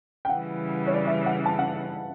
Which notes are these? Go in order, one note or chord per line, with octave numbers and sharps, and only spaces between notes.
G5
C#3 E3 G3 F#5
C#5
D5
E5
F#5
A5
F#5